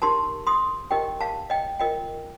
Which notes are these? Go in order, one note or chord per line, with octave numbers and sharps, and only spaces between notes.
D#4 G4 A#4 A5 C6
C6 D#6
D#4 G4 A#4 D#5 G5
F5 A5
D#5 G5
F4 A#4 D#5 G5